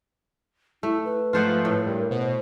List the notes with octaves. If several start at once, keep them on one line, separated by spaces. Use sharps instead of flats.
A3 E4
B4
G#2 F3 A3 F4 C5 F#5
A2
G2 A#4
B2 C5